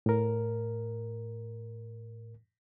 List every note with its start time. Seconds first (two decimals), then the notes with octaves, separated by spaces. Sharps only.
0.06 A2 A#4